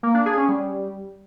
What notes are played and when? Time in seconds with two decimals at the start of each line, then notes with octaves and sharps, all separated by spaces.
0.03 A#3
0.14 D4
0.26 G#4
0.37 C#4
0.49 G3